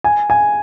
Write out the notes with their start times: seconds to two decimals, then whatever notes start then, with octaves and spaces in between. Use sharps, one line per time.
0.04 G#5
0.30 G#5